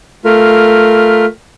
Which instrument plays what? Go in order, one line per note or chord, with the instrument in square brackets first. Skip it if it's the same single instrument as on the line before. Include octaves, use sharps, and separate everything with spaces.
[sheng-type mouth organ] A3 F4 A#4